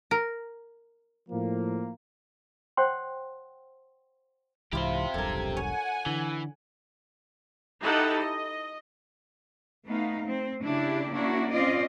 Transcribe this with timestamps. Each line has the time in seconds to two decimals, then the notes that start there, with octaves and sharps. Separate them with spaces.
0.11 A#4
1.29 A2 F3 A#3
2.77 C5 C#5 F#5 G5 C6
4.73 C2 G#2 E3 E4 F4 G4 C5
5.14 E1 B1 G2 A4 A#4 G#6
5.57 C#5 F#5 G#5
6.06 D3 E3
7.82 D#4 E4 G4 A4 F#5
8.17 D#5
9.87 A3 B3 D#4 F5
10.26 C4
10.63 C#3 D4 E4 G4
11.11 A#3 C#4 D4 E4 F#4
11.51 C4 C#4 F4 D5 D#5